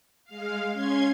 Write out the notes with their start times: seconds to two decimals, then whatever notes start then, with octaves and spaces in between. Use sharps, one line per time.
0.24 G#3 F5
0.72 C#4 C6 G#6